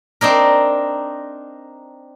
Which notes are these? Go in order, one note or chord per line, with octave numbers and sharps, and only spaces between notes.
C4 D4 D#4 A#4